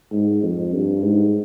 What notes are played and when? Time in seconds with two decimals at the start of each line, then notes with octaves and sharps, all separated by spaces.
0.12 G#2
0.43 F2
0.73 G2
1.03 G#2